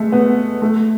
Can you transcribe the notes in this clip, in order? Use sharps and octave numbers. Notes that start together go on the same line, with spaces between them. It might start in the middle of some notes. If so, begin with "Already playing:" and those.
Already playing: G#3 A3
B3
A3